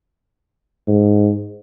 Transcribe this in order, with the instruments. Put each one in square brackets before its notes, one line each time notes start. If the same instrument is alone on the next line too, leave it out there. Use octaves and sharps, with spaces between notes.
[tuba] G#2